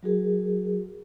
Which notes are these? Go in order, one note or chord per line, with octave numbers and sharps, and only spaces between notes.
F#3 F#4 G#4 A#4